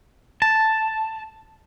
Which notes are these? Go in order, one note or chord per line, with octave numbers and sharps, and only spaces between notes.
A5